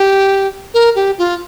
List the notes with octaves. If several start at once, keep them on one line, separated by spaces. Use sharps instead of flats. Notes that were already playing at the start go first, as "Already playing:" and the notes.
Already playing: G4
A#4
G4
F4